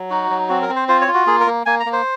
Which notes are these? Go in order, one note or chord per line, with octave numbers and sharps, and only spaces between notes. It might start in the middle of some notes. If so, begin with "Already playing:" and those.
Already playing: F#3
D#4 F#4
F#3
C4 F#4
A#4
C4
C5
F4 C5
C#5
F4
F#4
A#3 G#4
A#4
A#3
A#3 G#5
A#5
A#3
C5